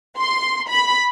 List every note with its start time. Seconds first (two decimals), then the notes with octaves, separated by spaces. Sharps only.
0.18 C6
0.68 B5